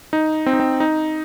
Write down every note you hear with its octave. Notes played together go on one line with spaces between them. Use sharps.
D#4
C4
D#4
C4
D#4